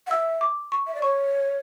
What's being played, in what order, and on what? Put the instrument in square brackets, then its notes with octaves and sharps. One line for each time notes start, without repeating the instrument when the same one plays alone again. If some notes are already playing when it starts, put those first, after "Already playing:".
[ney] F#5
[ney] E5 [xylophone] E6
[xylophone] D6
C#6
[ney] E5
D5
[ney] C#5 [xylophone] C#6